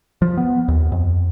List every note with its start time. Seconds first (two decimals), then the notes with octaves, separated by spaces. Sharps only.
0.22 F3
0.37 B3
0.68 D#2
0.92 F2